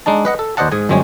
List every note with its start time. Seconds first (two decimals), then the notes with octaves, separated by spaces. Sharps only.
0.06 G#3 D4 D#4 A5
0.25 B4 D#5 F#5
0.39 A4
0.57 D#2 C5 D5 D#5 F#5 A5
0.72 G#2 G#4 G#5
0.89 G1 F#2 G#3 C4 C#5 G#5